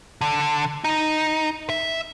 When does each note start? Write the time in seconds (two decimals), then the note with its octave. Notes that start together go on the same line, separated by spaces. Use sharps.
0.21 D3
0.84 D#4
1.69 E5